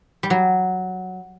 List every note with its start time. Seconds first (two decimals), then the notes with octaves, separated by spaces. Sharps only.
0.23 G3
0.30 F#3